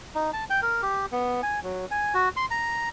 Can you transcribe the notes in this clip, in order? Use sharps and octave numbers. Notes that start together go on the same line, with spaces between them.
D#4
A5
G5
A#4
G4
B3
G#5
F#3
G#5
F#4
C6
A#5